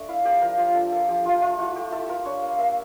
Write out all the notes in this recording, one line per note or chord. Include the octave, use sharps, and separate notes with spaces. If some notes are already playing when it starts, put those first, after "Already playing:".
Already playing: A3 D4 D5
E4 F5
A#3 G4
F3 A#4
F3 G4
D4 A4
A#3 A4
F3 G4
F3 F4
A3 F4
E4 F4
A3 G4
E4 A4
F4 A#4
D4 C#5
A#3
F5
A#3 E5